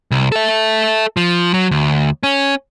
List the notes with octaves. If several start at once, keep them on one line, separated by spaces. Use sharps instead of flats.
C2
A4 E5
F3
F#3
D2
C#4